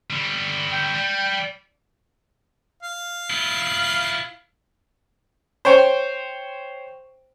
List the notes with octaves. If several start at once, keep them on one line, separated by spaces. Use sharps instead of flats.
D3 G3
G5
G3
F5
E4 F4
C5 C#5 G5 C6 C#6